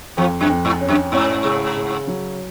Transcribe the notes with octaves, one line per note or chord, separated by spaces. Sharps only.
F2 F3
F#2
F2
G#2
C#4
F#2
G#2 C#4
C#3
C#3
F#3